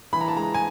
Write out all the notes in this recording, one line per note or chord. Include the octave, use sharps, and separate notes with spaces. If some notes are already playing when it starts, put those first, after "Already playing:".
E3 B5
A#5
A5
G#3 A#5
G#5